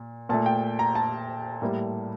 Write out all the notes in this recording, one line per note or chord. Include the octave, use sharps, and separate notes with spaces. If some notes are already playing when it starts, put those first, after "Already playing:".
Already playing: A#2
A#2 A3 A5
G5
A#5
A5
A2 G3 A#3